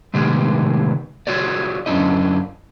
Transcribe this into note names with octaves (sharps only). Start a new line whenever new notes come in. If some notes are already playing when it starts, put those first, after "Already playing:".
A2 C3 D#3 G#3 B3 G4
F4 F#4 G#4 C#5 D5
F#2 C#4 D4 E4 D#5